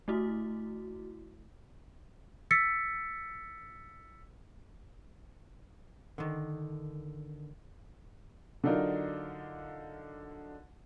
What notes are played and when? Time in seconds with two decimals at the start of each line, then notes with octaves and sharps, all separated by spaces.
0.08 A3 E4 F#4
2.51 E6 A6 B6 C#7
6.18 D3 D#3
8.64 D3 F#3 D4 D#4 F4 A#4